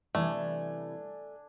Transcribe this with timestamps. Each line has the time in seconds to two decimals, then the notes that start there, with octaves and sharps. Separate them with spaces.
0.15 C3 E3 G3 A3 D4 G#5